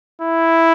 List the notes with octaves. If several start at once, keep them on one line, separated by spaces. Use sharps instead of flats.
E4